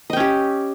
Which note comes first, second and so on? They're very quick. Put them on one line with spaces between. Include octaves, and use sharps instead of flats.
D#5 G5 C#4 G4